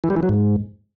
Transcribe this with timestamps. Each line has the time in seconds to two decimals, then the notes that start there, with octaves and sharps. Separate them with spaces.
0.04 E3
0.10 G3
0.16 E3
0.23 F#3
0.29 G#2